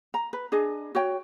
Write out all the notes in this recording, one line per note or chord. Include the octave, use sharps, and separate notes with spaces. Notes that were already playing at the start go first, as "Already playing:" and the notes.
A#5
B4
D4 G#4 D#5
F#4 C#5 G5